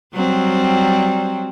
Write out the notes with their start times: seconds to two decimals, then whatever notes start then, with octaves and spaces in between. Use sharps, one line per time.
0.14 F#3 G3 C4